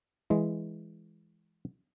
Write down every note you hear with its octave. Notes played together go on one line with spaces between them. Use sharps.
E3 G#3